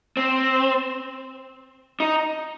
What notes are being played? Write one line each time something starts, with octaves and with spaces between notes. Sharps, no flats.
C4
D#4